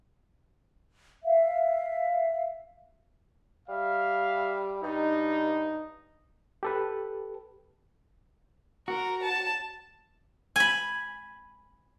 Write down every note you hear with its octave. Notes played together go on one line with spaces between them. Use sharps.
E5 F5
G3 E5 F5
G2 D#4
G4 A4 B4
F#4 A#4
A5
G#5 B5